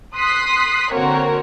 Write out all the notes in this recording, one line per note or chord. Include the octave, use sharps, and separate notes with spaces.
C6 D#6 F#6 B6 C7
D3 A#3 C4 F#4 A#4 C#5